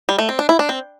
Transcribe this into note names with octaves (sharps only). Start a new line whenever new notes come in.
G3
A3
C4
D4
E4
D4
C4